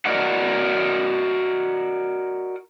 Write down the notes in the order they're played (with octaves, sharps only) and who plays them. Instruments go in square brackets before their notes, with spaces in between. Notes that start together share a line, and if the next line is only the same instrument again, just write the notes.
[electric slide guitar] F#4 A#4 D5 D#5 F#5